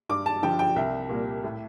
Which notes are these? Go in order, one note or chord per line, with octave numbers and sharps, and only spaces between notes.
G2 D6
A5
D3 F3 G5
G5
C2 E5
A#2 G3 A#3
A2